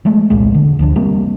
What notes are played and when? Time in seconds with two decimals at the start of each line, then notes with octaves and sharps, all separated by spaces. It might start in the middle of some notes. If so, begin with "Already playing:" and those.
0.05 F3 G#3 A3
0.30 E1 C2 A#2 G#3
0.54 D3
0.79 D2 F3 D4
0.96 C3 G3 A#3 C4